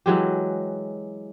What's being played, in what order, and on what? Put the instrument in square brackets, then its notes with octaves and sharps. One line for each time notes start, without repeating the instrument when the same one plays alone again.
[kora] E3 F#3 G#3 G4